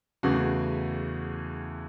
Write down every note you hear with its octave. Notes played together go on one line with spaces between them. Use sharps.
E2 C#3 E3 A3 F#4